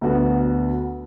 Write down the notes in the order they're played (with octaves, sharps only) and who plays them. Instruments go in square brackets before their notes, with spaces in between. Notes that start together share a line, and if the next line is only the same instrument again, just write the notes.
[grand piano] D2 D3 B3 F#4